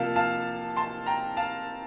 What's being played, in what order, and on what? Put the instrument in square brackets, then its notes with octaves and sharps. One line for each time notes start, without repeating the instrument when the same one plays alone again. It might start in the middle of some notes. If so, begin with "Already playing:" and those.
Already playing: [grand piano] C3 F3 A#3 F5 A5
F5 A5
A5 C6
G5 A#5
F5 A5